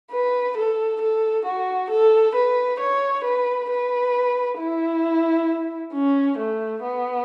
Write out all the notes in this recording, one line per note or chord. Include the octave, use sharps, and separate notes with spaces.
B4
A4
A4
F#4
A4
B4
C#5
B4
B4
E4
C#4
A3
B3